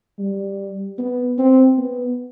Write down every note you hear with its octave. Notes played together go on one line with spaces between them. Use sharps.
G3
B3
C4
B3